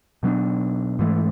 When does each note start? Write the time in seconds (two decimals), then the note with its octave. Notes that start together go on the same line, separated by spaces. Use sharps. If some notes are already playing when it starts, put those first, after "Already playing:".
0.23 B2 F#3 B3 D4
0.99 G#2 E3 A3